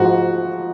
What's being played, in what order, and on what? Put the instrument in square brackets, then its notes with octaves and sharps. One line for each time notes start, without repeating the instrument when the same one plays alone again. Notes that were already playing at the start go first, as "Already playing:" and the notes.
Already playing: [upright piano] G#2 F3 F#4